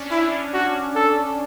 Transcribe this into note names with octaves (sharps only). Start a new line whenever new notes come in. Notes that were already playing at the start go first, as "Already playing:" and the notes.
Already playing: C#4 D4
C#4 E4
F#4
A4